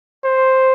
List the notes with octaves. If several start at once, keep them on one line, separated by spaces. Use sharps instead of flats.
C5